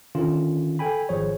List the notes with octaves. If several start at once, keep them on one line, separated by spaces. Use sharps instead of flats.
D3 D#3 C#4 F4
A4 G5 G#5 B5
G#1 F3 G#4 C5 C#5